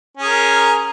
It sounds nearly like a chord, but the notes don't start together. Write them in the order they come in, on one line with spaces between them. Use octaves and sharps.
C#4 G#4 A#4